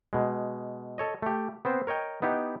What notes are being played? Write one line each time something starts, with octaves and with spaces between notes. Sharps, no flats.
B2 G#3
A4 C#5 D#5
A3 G4
B3 C4 C5
A#4 C#5 D#5 G5
B3 D#4 E4 G4